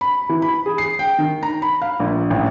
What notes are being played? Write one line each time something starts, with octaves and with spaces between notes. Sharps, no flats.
B5
E3
B5
G#4
C7
G5
D#3
A#5
B5
F5
A#1
A1